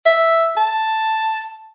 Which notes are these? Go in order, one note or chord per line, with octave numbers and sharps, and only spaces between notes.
E5
A5